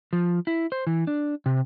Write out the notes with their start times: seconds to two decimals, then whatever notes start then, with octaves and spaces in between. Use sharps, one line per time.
0.13 F3
0.47 E4
0.72 C5
0.87 E3
1.07 D4
1.46 C3